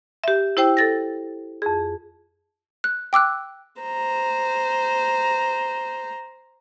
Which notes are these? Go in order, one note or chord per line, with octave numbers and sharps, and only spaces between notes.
G4 E5
E4 G4 C5 G5 E6
A4 A6 A#6
F2 G#4
F#6
G5 D6 E6 F#6
C5 A#5